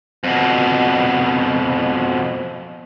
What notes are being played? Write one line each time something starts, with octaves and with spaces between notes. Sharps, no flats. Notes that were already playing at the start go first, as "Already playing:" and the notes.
F2 B2